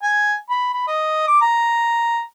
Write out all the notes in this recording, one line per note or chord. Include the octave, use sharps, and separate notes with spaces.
G#5
B5
B5
D#5
D6
A#5